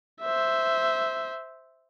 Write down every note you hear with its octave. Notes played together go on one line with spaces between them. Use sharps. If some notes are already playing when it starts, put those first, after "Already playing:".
C5 E5